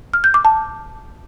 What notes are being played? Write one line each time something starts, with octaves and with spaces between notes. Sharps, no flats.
F6
G6
D6
A5